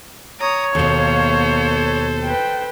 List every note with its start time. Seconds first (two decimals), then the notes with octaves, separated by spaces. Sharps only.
0.40 C#5 A#5 D#6
0.75 D#2 B2 A#3 A4 C5 F5
2.24 B4 G5